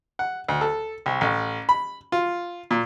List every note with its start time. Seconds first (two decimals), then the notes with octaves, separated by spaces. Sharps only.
0.19 F#5
0.49 D2
0.61 A4
1.06 C2
1.21 A1
1.69 B5
2.12 F4
2.71 A#2